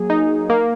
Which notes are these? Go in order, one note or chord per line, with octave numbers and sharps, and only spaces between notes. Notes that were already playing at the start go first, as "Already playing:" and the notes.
Already playing: F#3 A#3 G#4
D#4
A#3